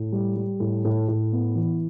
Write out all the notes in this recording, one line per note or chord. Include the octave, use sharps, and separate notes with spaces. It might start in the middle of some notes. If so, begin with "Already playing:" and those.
Already playing: A2
G3
G3
A2
A2
A2
B3
E3